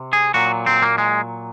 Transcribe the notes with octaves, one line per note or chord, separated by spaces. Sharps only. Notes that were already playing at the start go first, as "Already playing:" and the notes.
Already playing: C3
G#4
A#2 F#3 F#4
C4
A#3
G#3